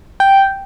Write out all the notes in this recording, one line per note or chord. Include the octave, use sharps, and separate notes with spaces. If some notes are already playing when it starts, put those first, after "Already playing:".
G5